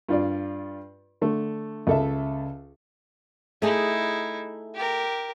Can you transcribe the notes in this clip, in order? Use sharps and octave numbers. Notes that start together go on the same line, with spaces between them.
G2 F4 D5
D3 A3
C#2 A4 E5
A3 D#4 E4 G#4
G4 A#4